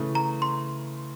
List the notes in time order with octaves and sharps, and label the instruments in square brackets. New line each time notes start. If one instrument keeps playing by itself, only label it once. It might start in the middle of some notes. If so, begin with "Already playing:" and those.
Already playing: [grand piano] C#3 E3 A3
[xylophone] A#5
C6